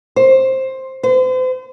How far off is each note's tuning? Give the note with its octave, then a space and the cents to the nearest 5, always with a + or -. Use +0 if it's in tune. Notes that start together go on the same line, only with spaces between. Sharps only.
C5 +10
C5 -40